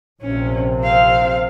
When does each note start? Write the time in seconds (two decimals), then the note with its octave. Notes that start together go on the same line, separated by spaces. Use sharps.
0.22 A#1 C3 C#4
0.81 C4 F5